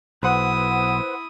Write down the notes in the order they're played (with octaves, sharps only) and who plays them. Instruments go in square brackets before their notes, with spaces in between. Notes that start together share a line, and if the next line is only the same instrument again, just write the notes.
[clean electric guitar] B1 [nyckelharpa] E4 D#6 [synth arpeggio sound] B4 C5 F#5